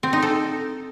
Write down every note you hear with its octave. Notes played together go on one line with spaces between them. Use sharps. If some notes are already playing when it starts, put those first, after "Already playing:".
C4
D#4
A4